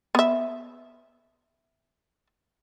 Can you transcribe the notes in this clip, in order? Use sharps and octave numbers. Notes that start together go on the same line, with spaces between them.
B3 E5